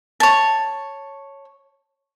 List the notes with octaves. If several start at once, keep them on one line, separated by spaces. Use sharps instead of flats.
C#5 A5